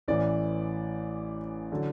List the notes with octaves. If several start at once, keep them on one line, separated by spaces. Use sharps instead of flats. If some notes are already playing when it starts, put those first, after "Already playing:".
A1 A2 E3 D5
D3 F#3